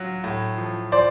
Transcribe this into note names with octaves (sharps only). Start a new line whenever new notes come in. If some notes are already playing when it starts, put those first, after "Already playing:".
Already playing: F#3 F4
A2
F3
F3 C5 D5